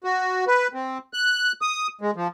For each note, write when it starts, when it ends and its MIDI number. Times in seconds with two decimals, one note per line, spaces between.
0.04 0.45 66
0.47 0.67 71
0.73 0.98 60
1.13 1.52 90
1.61 1.87 87
2.01 2.11 56
2.16 2.28 53